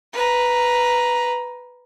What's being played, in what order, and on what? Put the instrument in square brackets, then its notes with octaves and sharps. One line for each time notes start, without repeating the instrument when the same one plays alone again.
[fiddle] B4 A#5